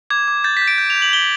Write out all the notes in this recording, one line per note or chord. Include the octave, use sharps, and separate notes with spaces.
D6 G#6
D6
G6 A6
B6
G6
D7
G6
F7
G6
F#7
G6 G7